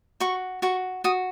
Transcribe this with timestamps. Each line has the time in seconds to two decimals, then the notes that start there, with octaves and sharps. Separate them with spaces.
0.20 F#4 C#6
0.62 F#4 C#6
1.04 F#4 D#6